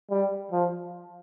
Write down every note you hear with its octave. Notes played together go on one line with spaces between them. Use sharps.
G3
F3